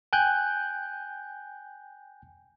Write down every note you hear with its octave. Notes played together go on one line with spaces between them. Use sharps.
G5 G#5 F#6 G6